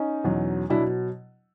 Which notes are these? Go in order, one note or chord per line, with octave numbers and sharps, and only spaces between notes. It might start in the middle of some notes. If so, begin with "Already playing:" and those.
Already playing: C#4 D#4
E2 B2 F#3
B2 F#3 D4 E4